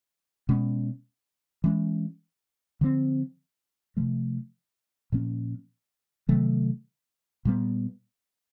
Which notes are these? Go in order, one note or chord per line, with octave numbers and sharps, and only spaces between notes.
B2 G#3 C#4
E3 G#3 C#4
D3 F3 A3 C4
C3 F3 A3
A#2 F3 A#3 C#4
C3 D#3 F#3 A3
A#2 G3 B3